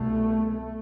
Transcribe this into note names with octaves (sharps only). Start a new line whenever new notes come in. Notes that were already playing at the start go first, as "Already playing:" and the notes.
Already playing: C2 B2 A3
A3